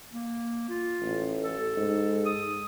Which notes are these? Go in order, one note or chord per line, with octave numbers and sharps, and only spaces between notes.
A#3
F4
A1
A4
G#2
D#6